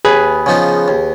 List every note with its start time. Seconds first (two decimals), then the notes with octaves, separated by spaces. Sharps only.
0.05 D#2 G#4 B4
0.46 C#3 F3 B3 D#4
0.88 D#2